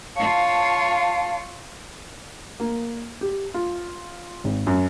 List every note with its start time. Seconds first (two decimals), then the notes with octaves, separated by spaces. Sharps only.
0.16 F4 C#5 F5 A5
2.60 A#3
3.21 G4
3.54 F4
4.44 G#1
4.67 F#2